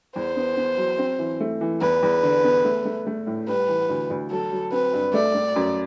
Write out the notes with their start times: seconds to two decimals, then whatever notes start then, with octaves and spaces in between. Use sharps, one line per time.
0.16 E2 C5
0.36 B3
0.57 B3
0.77 F#3
0.99 C4
1.19 E3
1.40 A3
1.61 E3
1.81 E2 B4
2.03 E2
2.23 D3
2.44 B3
2.65 A3
2.85 A3
3.07 A3
3.27 A2
3.48 G3 B4
3.69 E3
3.89 D2
4.10 D2
4.31 F#3 A4
4.51 F#3
4.72 C4 B4
4.93 G2
5.14 A3 D5
5.35 A3
5.56 F#2